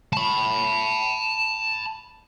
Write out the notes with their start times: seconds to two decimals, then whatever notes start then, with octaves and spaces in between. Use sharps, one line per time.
0.13 A5 B5